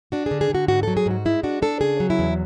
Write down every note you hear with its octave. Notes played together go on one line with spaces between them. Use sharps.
D4 F#4
D3 G#4
G#4
D3 F#4
G#2 F#4
F#3 A4
G#4
G#2 F#4
G#3 E4
D4 F#4
D4 A4
C#3 G#4
F#3
E4
E2